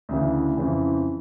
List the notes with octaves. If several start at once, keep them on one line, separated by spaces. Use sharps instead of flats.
D2 C#3 E3
F2 C#3 E3